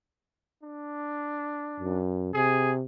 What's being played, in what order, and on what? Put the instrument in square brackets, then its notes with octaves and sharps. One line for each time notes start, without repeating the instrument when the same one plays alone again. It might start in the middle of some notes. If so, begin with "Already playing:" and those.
[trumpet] D4
[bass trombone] F#2
[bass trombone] C3 [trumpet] G#4